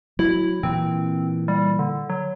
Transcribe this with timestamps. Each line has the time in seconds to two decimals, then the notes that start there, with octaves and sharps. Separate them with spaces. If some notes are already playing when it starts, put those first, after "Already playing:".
0.19 F#3 E4
0.63 A#2 E3 C4
1.48 G3
1.79 D3
2.10 F#3